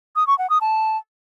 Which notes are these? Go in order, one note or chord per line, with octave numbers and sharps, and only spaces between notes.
D#6
C#6
F#5
D#6
A5